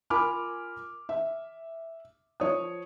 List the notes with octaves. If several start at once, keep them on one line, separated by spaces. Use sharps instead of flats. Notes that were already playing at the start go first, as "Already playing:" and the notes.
F4 A#4 G#5 B5 D6 F6
E5
F3 C#5 D#6